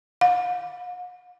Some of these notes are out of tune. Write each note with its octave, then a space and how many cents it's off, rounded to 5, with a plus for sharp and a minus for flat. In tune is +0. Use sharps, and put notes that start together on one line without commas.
F#5 -45